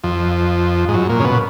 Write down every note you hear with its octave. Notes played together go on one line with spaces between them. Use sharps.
F2
G#2
F#2
A#2
C#3
B2